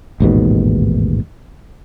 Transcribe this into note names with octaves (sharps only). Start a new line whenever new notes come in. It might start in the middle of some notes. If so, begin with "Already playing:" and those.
A1 D#2 G#2 B2